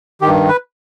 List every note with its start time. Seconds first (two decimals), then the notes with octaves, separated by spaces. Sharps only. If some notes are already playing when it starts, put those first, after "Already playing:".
0.22 G2 D#3 G4
0.48 B4